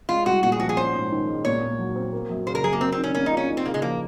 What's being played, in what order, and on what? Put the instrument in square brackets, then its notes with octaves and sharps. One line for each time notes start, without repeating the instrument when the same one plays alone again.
[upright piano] G#3 [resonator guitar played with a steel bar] F4
[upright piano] C2 [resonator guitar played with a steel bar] F#4
[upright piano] A#2 [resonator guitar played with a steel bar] F#4
[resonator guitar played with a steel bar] G#4
[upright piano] F3 [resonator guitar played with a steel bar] F#4
[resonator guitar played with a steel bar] G#4
[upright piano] C#4 [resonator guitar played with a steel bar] C5
[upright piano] G#2
D#3
G#3
[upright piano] A#2 [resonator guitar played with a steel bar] C#5
[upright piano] A#2
F#3
C4
A#3
F#2
[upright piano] C#3 [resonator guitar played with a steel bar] C5
[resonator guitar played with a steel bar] A#4
[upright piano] F#3 [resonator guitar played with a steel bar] G#4
[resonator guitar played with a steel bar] A#3
[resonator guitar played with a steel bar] C4 [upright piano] A#4
[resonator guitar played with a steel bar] C4
[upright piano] D#3
[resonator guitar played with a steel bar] C#4
[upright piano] A#3 [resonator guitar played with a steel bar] C#4
[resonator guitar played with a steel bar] D#4
[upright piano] F4
[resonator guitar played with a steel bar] C#4
[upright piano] D#4
[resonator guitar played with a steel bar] C4
[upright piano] C#3 [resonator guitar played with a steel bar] A#3
[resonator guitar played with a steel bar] G#3
[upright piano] F3 [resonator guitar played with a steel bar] A#3